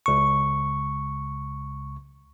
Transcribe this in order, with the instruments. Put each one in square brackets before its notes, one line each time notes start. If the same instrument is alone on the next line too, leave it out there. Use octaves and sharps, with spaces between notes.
[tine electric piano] C#2 C#6